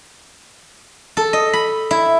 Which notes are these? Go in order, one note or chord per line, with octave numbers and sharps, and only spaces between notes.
A4
D#5
B5
E4